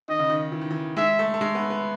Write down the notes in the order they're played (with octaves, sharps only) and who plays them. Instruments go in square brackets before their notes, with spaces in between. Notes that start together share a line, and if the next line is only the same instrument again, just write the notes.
[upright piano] D#3 [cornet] D#5
[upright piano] C#3
D#3
E3
D#3
E3
[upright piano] G#3 [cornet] E5
[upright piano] A3
A3
G#3
B3
B3